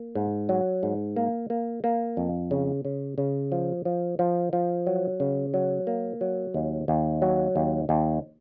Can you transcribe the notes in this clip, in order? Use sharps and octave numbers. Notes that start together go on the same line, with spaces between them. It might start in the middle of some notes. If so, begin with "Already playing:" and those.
Already playing: A#3
G#2
F#3
G#2
A#3
A#3
A#3
F2
C#3
C#3
C#3
F3
F3
F3
F3
F#3
C#3
F#3
A#3
F#3
D#2
D#2
F#3
D#2
D#2